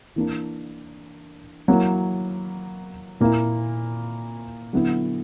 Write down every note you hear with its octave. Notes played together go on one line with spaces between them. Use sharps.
E3 A#3 D4
F#3 A#3 E4
A#2 A#3 E4
D3 F#3 B3 E4